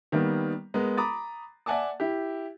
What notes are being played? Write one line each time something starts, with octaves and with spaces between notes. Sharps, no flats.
D#3 G3 A#3 B3
G#3 B3 A#4
A#5 B5 D6 D#6 A6
D5 E5 F#5 G#5 A5 D6
E4 G4